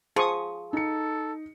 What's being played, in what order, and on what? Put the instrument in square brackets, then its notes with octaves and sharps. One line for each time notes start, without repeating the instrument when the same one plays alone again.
[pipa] F3 [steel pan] G#4 C#6 D#6
[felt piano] D#4 C#7 [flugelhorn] A4